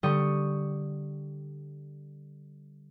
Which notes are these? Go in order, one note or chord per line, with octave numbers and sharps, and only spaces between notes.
D3 G3 G5 C#6 D#6